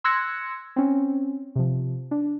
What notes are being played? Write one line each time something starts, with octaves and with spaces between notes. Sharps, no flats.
C6 E6 F#6 G#6 A#6 C#7
C4 C#4
C3 F3
D4